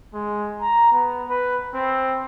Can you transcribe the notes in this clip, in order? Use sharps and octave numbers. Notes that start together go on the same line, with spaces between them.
G#3
A#5
B3
B4
C4